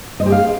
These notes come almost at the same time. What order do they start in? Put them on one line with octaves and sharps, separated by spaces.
D#5 C5 G4 G#4 F5